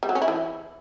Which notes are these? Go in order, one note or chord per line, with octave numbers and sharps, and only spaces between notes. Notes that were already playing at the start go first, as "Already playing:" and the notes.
G3
F#3
C#4
E4
E3